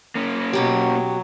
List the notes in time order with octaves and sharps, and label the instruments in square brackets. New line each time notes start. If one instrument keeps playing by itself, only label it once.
[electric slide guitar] A#3 C#4
[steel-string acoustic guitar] B2 B3 G4 [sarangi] F#3